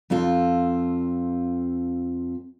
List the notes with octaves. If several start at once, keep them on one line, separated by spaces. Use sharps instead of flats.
F2 C4 F4 A4